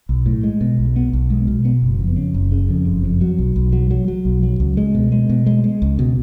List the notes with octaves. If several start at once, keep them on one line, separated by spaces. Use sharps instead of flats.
B1
A2
G#3
B2
B1
B3
B1
G#3
B2
B3
F#1
F2
C#3
F#1
C#3
F2
F#1
F2
F#3
B1
B1
F#3
F#3
F#3
B1
F#3
C#2
G#3
B2
G#3
B2
G#3
G#3
C#2
B2